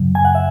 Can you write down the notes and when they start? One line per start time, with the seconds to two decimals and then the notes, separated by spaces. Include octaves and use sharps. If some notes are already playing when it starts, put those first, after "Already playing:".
Already playing: F#2 C#3 F#3
0.15 G#5
0.25 F#5
0.35 E5